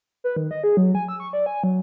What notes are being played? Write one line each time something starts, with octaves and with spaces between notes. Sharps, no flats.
B4
D#3
D#5
G#4
F#3
G#5
E6
C#6
D5
G#5
F#3